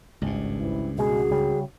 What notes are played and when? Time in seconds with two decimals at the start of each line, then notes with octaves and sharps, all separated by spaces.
0.22 G#1 C#2 G2
0.59 E3 C4 E4
0.98 B2 G#3 F#4 G#4
1.31 C#3 G3